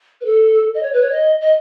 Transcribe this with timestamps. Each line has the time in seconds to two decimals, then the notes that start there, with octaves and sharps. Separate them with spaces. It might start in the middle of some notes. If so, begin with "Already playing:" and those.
0.21 B4
0.25 A4
0.74 D#5
0.82 C#5
0.93 B4
1.02 C#5
1.11 D#5
1.41 D#5